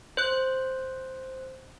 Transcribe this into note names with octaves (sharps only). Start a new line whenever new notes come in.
C5 F#6